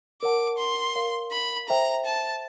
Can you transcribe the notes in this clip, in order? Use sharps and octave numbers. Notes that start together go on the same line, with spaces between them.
A#4 C#5 F#5 A5 D6
C6
A#4 C#5 F5
B5
A4 C5 E5 G5 A#5
A5